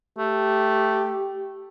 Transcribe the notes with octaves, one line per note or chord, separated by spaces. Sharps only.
A3 G4